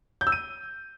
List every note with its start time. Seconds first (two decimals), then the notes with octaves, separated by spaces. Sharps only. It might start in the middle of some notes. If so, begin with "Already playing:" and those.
0.21 G6
0.27 E6
0.32 D#7